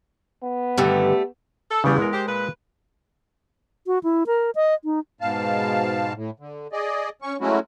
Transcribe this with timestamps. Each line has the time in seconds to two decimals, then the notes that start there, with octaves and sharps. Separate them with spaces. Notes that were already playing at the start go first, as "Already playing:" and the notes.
0.43 B3
0.77 G2 D3 D#3 G3 A3
1.71 A4
1.84 E2 C#3 G3
1.99 G#3 A#4
2.13 G4 C5
2.27 A#2 B4
3.87 F#4
4.03 E4
4.27 A#4
4.55 D#5
4.84 D#4
5.21 G#2 B2 F5 A5
6.15 A2
6.40 D3
6.72 G#4 D5 D#5
7.22 C#4 C#6
7.41 F#3 G#3 A3 C#4 E4 F#4